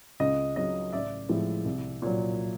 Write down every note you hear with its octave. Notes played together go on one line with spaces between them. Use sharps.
C#2 D#5
C#3 F#3 D#5
A1 D5 E5
A2 F3 G#3
C2
A#2 F#3